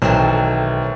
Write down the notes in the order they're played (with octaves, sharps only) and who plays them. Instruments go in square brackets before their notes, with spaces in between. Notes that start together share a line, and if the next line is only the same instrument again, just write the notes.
[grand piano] B1 D#3 F#3 [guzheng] E3 A3 C4